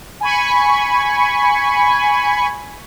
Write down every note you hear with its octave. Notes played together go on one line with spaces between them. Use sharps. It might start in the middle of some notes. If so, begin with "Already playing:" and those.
G#5 B5 C#6